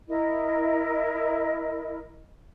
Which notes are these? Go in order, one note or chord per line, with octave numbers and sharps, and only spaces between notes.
E4 A#4 D#5